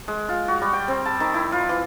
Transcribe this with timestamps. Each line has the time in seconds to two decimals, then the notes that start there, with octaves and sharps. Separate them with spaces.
0.08 G#3
0.29 F4
0.48 F#4
0.61 G3
0.73 G5
0.88 C4
1.05 A5
1.20 D#3
1.34 E4
1.52 F4
1.69 E3